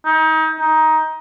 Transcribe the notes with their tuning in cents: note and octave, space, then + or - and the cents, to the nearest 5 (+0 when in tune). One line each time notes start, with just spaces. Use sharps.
D#4 +30
D#4 +15